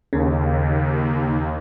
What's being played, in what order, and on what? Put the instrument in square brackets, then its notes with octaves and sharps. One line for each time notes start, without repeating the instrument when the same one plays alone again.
[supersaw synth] D#2 [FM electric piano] C#3